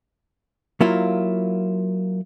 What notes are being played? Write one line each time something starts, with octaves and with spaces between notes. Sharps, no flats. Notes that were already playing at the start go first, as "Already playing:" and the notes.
F#3 A#3 E4 F4